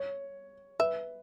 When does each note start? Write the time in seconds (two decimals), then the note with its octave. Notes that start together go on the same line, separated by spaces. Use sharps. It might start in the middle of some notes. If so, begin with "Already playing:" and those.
Already playing: C#5
0.79 B4 E5